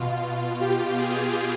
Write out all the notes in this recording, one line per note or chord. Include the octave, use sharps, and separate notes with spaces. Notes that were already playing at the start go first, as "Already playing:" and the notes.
Already playing: B2 F4
G4
G#4